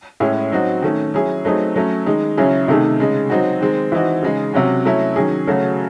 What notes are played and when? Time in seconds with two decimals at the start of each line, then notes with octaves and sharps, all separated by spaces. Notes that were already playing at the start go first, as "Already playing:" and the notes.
0.20 A2 G#3 C#4 E4 G#4
0.52 F#3 C4 D#4 F#4
0.82 D#3 A3 C#4
1.14 F#3 C#4 E4 G#4
1.45 F#3 A3 C4 D#4 G#4
1.76 F#3 A3 C#4
2.06 D#3 G#3 D#4
2.37 C#3 F#3 C#4 E4 G#4
2.68 C3 D#3 A3 D#4 G#4
3.00 C#3 G#3 D#4
3.30 F#3 C4 D#4 F#4
3.61 D#3 G#3 C4
3.92 E3 C4 D#4 F#4
4.23 C#3 G#3 D#4 G#4
4.53 C3 F#3 C#4 F#4
4.85 F#3 A3 C#4 E4
5.16 D#3 F#3 C#4 G#4
5.47 C#3 F#3 A3 C#4 F#4